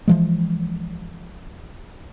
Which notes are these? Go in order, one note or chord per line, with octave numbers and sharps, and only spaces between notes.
E3 F3 G#3